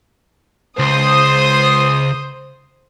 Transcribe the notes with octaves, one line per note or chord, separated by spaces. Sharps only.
C#2 C5 D#6